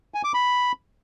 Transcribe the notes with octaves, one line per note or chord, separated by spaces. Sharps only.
G#5
D6
B5